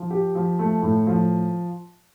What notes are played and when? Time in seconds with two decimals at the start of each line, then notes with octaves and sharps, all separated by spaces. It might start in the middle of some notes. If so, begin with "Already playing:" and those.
Already playing: F3
0.10 G4
0.35 F3
0.59 A3
0.82 A2
1.07 F3